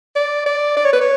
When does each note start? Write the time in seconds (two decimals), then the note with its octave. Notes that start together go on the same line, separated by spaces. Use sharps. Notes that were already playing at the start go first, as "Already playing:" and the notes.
0.16 D5
0.46 D5
0.77 D5
0.85 C#5
0.93 B4
1.01 C#5